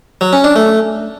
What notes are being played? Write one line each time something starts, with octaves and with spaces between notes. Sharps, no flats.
F#3
C#4
D4
A3